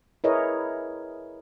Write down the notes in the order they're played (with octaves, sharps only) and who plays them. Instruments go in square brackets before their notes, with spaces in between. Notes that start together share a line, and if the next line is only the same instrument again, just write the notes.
[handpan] E4 G#4 A#4 B4 C#5 D#5